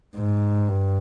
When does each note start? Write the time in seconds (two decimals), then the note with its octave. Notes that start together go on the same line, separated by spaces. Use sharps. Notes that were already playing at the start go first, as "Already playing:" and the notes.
0.16 G#2
0.69 G2